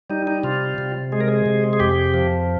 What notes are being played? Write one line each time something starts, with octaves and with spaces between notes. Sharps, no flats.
G3 D#4
D#4
C3 F4
C3
G#3 G#4
A#4
G#4
C3
G#4
F2 G4
F3